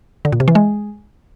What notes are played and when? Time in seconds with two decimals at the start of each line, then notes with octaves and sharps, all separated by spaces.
0.25 D3
0.32 A#2
0.40 C3
0.48 E3
0.55 G#3